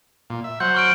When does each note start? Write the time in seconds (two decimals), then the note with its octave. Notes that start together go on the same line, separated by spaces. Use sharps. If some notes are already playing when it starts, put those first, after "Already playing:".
0.30 A#2
0.44 E5
0.60 F#3 C5 F#5 G6
0.74 C#6 F6 D7